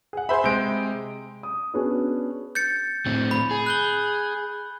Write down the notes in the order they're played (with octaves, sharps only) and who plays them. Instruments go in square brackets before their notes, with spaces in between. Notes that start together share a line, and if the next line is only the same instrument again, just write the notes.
[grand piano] G#4 F#5
[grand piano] G#4 C5 E5 [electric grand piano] B5 C6
[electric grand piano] C3 G#3 [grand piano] G6 D7
[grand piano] D#6
B3 C#4 D4 F#4 G#4
[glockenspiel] G6 A6 C#7
[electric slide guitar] A2 C4
[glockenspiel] B5
[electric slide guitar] G#4
[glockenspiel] F#6 G6 G7